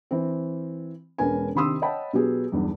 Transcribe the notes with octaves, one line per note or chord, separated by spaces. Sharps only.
E3 C4
E1 G#3 C#4 A#4 B4 G#5
C3 D#3 B5 C6 D#6 E6
C#5 D#5 F#5 G5 A5 B5
B2 F#3 B3 G4 G#4
B1 E2 G2